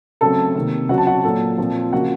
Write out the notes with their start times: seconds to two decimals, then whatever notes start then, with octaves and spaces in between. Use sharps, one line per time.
0.21 C#3 F#3 A3 C4 A4 A5
0.55 C3 D#3 A#3
0.89 C#3 F#3 C4 F#4 F#5
0.98 A5
1.07 F#4 F#5
1.24 A#2 F#3 A#3 A4 A5
1.58 A#2 F3 C4
1.92 C#3 F3 A#3 F#4 F#5